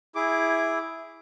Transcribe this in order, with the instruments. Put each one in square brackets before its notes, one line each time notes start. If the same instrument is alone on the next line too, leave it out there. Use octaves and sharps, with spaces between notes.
[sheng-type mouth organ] E4 G#4 D6